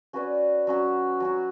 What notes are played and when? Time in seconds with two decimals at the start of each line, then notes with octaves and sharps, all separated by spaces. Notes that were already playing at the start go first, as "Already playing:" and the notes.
0.13 C#4 F#4 B4 D5
0.67 F#3 C#4 F#4
1.20 F#3 C#4 F#4